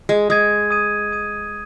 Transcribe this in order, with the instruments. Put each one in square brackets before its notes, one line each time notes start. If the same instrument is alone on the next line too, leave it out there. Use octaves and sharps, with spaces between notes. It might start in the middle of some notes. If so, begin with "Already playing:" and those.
[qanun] G#3
[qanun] G#3 [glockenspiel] D#6 G#6 D#7
[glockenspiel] D#6 G#6 D#7
D#6 G#6 D#7